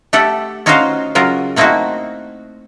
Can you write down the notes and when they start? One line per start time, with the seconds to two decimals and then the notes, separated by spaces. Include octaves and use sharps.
0.13 A3 G4 A4 F#5
0.66 C#4 D#4 F4 F#4 C5 F5
1.15 C#3 F#3 F4 A#4
1.56 A3 A#3 C4 D#4 E4 F#4